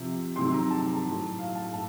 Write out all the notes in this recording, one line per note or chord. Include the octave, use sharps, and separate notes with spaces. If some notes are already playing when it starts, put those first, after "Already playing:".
Already playing: C3 F3
C3 D#3 F#3 C6
A#5
A5
A2 F#3
F5
A5
A2 A5